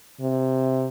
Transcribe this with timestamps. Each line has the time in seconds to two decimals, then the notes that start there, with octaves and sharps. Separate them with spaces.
0.20 C3